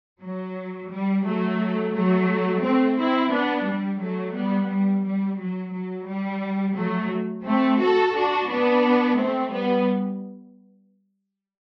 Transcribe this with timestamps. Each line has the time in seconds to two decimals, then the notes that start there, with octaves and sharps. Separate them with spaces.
0.22 F#3
0.92 G3
1.25 F#3 A3
1.94 F#3 A3
2.63 A3 C4
2.98 C4 E4
3.32 B3 D4
3.67 G3
4.01 F#3 A3
4.36 G3 B3
4.70 G3
5.05 G3
5.40 F#3
5.74 F#3
6.08 G3
6.76 F#3 A3
7.45 A3 C4
7.81 F#4 A4
8.14 D4 F#4
8.49 B3 D4
9.18 A3 C4
9.53 G3 B3